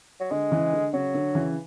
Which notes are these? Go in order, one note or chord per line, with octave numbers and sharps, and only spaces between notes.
F#3
D3 G#3
C#3 E3
D3
C#3 F#3
D3
C#3 E3